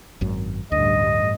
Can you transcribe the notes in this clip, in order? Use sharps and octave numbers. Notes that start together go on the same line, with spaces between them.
G#1 F#2
A1 D2 G2 D#5